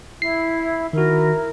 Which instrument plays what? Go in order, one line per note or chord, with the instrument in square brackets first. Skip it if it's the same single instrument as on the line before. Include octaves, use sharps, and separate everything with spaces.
[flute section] E4 [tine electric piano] C7
[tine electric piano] D#3 F#4 [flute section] E4 A#4